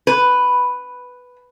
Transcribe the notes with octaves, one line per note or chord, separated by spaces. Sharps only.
B4